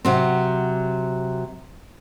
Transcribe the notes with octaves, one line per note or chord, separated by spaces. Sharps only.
C3 F#3 C4